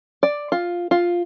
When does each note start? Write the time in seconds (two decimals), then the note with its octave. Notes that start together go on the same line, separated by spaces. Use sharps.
0.23 D5
0.52 F4
0.91 F4